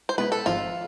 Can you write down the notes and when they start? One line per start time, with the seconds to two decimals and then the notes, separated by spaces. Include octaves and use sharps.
0.09 C5
0.18 B2 G#3 B3 E4 B4
0.32 A4
0.46 G#1 G#2 F3 G#3 F4